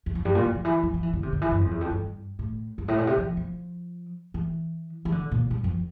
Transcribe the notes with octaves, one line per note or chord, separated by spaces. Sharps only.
E2
F2
G2
A#2
F2
D3
E3
F3
F3
E3
D3
C3
D3
E3
G2
F2
E2
F2
G2
A2
G2
A2
A#2
C3
F3
F3
E3
E3
D3
A#2
G2
F2